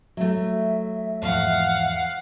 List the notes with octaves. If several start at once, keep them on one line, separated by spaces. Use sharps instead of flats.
F#3 A3 E5
E2 G#2 F3 F5 F#5